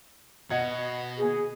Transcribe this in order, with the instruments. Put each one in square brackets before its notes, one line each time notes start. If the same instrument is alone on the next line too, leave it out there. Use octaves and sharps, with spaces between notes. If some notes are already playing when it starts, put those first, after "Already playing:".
[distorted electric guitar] B2 [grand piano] D#5 F#5 G#6
[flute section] G#4